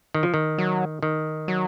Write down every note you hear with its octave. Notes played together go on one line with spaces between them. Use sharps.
D#3
F3
D#3
F#3
D#3
F#3